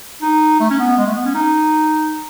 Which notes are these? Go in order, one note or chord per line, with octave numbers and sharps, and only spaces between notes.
D#4
A3
C#4
B3
G#3
A3
B3
C#4
D#4